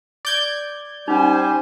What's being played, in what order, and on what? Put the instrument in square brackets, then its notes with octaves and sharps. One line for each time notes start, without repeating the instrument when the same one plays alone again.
[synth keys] D5 G6 G#6
[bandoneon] G3 G4 [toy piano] C#4 D#4 [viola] C5 G#5